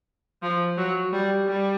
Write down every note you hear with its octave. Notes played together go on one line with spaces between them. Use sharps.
F3
F#3
G3
G3